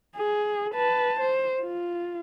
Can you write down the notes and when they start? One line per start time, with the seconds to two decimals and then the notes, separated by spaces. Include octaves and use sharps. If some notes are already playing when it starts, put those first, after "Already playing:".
0.16 G#4
0.75 B4 A5
1.20 C5
1.62 F4